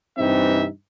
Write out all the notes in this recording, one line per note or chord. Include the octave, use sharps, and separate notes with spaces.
G2 C3 E3 C4 D#4 E5